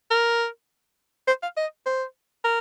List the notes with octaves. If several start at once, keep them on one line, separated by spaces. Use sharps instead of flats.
A#4
C5
F5
D#5
C5
A#4